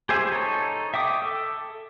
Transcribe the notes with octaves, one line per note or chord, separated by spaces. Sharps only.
G4 G#4 C5 E5 G#5
D#4 A4 C#5
E5 G5 D6 D#6
A4